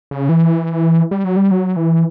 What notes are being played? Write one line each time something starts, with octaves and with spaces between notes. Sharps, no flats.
C#3
E3
G3
F#3
G3
F#3
E3